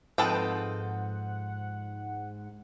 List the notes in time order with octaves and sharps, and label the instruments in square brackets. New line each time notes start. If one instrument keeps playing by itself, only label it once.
[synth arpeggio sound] G#2 F#5 [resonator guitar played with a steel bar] F3 C4 D#4 [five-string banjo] A4 B4 G5